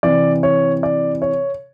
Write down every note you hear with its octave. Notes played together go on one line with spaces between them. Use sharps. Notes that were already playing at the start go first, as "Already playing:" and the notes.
C3 E3 D5
C#5
D5
C#5